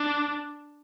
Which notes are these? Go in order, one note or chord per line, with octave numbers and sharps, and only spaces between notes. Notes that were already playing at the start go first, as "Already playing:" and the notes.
Already playing: D4